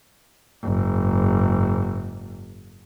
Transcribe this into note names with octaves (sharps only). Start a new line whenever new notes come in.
F#1 G#2